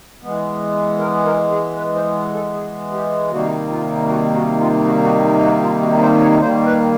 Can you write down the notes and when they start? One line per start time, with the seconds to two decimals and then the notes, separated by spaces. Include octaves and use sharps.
0.22 E3 G#3 B3
0.99 A#4
1.25 A#4
1.51 G#4
1.76 B4
1.95 C5
2.34 A4
2.54 G#4
2.92 G4
3.31 C3 D#3 G3 A#3 D#4 F#4
3.70 F4
4.08 F#4
4.34 F#4
4.60 F4
4.85 F#4
5.04 F#4
5.24 G4
5.43 F#4
5.63 F4
5.82 F#4
6.01 C5
6.21 C#5
6.39 D#3 G3 A#3 C5
6.66 B4